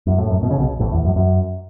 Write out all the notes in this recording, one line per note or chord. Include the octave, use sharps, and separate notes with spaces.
F#2
A2
F#2
B2
C#3
B1 B2
A1 A2
E2
F#2
F#2